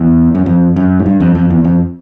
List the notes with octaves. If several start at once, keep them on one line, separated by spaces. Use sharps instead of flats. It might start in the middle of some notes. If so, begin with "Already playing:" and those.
Already playing: E2
F#2
F2
F#2
G#2
G2
F2
F2
E2
F2